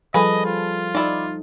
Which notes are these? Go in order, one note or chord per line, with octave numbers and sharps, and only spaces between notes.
F3 G3 G#4 A4 B4 D#5
F4
D#4 E4 D5